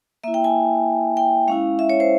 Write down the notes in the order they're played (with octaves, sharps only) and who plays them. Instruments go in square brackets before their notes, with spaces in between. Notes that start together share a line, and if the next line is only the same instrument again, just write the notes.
[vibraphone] A#3 E4 E5
G5
G#5
G5
G#3 C#4 E4 F5
E5
C#5
C5